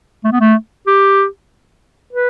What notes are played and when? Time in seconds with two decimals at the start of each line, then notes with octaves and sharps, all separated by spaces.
0.24 A3
0.32 B3
0.41 A3
0.87 G4
2.13 B4